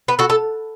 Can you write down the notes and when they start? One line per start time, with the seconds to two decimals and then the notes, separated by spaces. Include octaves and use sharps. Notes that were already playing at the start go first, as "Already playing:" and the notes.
0.08 B3
0.19 F#4 A4
0.30 A4